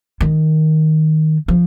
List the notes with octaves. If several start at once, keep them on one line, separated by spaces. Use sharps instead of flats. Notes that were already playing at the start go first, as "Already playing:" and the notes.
D#3
F3